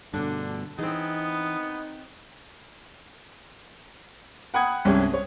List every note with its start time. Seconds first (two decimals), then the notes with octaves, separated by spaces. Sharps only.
0.14 G2 B2 D3 D4
0.79 E3 B3 C4 D#4 G#4
4.54 F#5 G5 B5 D#6 F#6 G#6
4.85 C2 G2 G#3 C#4 G4
5.11 C4 C#5